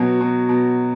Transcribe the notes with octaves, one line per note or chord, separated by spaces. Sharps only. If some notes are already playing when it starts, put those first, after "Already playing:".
Already playing: B2 F#3
B2
B2